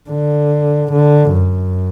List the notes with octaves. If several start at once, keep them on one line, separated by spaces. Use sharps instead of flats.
D3
D3
F#2